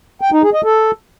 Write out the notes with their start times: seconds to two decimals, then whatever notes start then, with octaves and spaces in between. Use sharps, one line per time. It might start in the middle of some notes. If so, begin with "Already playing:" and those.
0.21 G5
0.32 D#4
0.43 G#4
0.53 D#5
0.64 A4